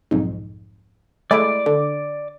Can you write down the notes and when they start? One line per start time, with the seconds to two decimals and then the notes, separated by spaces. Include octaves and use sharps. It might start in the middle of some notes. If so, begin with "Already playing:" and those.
0.11 B1 F2 G#2
1.31 G#3 A3 E4 D5 D6
1.66 D3